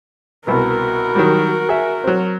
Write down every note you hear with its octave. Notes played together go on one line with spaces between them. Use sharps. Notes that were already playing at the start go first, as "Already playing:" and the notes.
C2 B2 B3 F#4 A#4
D#3 F#3 G3
G#4 E5
F#3 C4